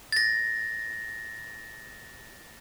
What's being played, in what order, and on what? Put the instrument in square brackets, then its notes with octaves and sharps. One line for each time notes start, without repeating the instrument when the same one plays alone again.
[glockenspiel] A6 A#6